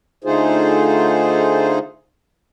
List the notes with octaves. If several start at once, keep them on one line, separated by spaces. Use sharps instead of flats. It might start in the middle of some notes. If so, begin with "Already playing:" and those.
D3 A3 D#4 F4 G#4 C5